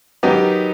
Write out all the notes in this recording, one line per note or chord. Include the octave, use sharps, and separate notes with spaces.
D#3 F#3 B3 D#4 G4